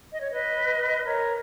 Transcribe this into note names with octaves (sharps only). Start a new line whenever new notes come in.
D#5
C#5
B4 D#5
A#4 C#5